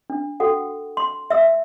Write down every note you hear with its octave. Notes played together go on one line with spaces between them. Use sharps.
D4
F#4 A4 F#5 G5
C6
E5 E6